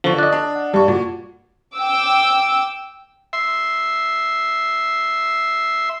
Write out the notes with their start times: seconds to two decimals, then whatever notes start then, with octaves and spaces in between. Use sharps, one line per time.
0.04 D3 F3 C#6
0.18 D5 D#5 F#6
0.32 D4
0.55 F#5
0.74 G2 G3 C#6
0.88 A#2 F#4
1.75 G5 D6 E6
3.33 E5 C6